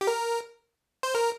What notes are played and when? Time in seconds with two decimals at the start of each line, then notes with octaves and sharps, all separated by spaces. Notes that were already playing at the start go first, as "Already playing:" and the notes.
0.01 G4
0.07 A#4
1.03 C5
1.15 A#4